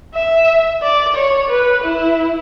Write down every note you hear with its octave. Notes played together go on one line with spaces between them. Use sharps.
E5
D5
C#5
B4
E4